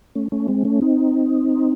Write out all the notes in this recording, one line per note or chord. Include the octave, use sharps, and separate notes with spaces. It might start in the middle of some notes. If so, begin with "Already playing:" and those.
A3 C#4
A3 C#4
G#3 C4
A3 C#4
C4 D#4